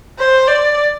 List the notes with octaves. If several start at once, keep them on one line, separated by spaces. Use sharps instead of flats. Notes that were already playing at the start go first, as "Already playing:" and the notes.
C5
D5